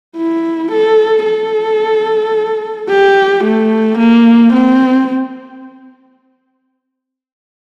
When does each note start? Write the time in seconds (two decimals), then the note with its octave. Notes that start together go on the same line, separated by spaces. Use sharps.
0.17 E4
0.72 A4
1.25 A4
2.89 G4
3.44 A3
3.98 A#3
4.53 C4